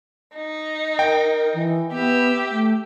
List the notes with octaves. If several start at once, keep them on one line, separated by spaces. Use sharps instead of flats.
D#4
A#4 G5
E3
B3 G4 E5
A3